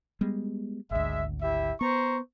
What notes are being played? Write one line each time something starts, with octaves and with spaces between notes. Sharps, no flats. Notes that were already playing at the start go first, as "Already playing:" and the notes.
G3 G#3 B3
G#1 D2 G#3 E5
E4 G4 E5
B3 C5 A#5 C#6